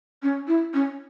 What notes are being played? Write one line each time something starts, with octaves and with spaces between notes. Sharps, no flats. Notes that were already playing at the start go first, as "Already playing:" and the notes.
C#4
E4
C#4